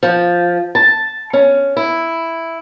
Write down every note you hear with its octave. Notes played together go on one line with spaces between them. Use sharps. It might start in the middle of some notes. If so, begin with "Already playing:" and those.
F3
A5
C#4
E4